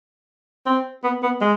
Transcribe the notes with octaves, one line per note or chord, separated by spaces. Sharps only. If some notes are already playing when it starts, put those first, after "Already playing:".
C4
B3
B3
G#3